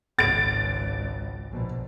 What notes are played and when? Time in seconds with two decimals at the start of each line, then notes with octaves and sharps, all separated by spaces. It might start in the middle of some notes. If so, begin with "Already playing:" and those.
0.19 G#1 C#2 A6 D7
1.51 A#1 B2